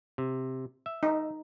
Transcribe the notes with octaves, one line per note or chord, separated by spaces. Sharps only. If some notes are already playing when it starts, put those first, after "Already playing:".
C3
E5
D#4